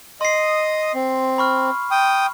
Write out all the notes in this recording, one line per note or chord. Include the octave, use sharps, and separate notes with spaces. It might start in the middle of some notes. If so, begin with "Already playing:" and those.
D#5 C6 D#6 C7
C4
B5 C#6 F6
G5 D#6